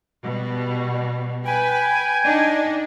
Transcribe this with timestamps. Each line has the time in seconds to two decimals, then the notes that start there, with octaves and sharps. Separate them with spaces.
0.23 B2 G3
1.45 B4 G5 G#5
2.24 D4 D#4